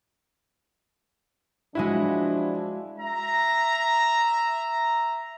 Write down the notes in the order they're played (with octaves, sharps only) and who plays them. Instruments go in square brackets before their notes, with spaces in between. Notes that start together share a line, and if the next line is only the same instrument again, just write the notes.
[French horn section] F3 D4 [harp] G#3 F#4 E5 [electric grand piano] E4
[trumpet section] E5 A#5